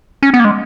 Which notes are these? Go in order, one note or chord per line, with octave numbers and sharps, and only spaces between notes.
C#4
B3
A#3
G#3